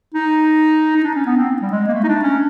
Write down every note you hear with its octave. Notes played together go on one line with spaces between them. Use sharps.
D#4
D#4
D4
C#4
B3
C4
G3
G#3
A#3
A3
D#4
D4
C#4